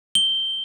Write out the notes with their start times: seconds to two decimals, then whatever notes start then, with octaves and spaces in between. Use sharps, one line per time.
0.15 G7